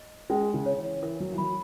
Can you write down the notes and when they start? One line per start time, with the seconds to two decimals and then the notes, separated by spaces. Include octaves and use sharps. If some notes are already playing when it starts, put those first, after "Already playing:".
Already playing: D#5
0.30 G#3 C#4
0.54 C#3
0.66 C#5
0.78 E3
1.02 E3 A#4
1.20 F#3
1.33 E3
1.38 F#3 B5